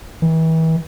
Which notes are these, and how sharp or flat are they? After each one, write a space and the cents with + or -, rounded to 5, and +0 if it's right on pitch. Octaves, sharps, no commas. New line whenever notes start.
E3 -35